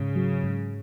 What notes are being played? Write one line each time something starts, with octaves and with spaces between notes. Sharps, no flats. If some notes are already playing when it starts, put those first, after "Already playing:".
Already playing: G#2 C#3
F#3
G#2